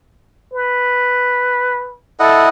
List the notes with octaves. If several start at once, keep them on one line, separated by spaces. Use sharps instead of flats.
B4
E4 A4 D#5 F#5